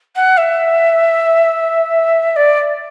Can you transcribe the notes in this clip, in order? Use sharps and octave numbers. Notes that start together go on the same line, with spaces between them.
F#5
E5
D5